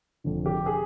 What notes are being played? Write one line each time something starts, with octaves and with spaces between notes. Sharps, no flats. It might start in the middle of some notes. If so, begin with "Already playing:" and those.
F1 F2 D3 F3
G4
G#4